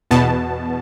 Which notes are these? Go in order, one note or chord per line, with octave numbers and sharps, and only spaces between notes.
E2 B2 B3 A5